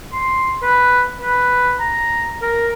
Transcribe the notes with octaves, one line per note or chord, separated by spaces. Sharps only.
C6
B4
B4
A#5
A#4